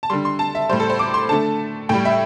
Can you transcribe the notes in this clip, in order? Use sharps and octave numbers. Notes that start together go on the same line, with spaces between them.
A5
D3 G3 C6
C6
A5
E5
A2 G3 C5
A4
C5
D6
C6
D3 A3 A5
A2 G3 G5
E5